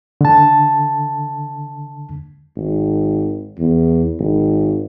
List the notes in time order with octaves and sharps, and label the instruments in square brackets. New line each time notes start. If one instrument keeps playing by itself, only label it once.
[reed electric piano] D3 A5
[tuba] G#1
E2
G#1